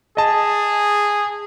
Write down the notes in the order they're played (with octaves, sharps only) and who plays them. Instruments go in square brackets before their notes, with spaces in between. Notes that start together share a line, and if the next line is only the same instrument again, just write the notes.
[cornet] G#4 [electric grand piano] D#5 A5